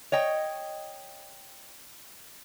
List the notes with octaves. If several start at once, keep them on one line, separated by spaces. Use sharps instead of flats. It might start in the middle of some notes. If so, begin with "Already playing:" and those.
C#5 D#5 G5